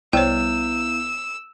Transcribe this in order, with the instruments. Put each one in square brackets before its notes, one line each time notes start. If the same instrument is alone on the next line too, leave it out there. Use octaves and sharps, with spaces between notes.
[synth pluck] C2 [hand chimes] B3 E4 G6 [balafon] C#5 G5 [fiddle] E6